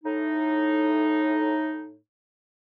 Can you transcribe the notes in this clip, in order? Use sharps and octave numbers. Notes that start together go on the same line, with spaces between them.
A2 D#4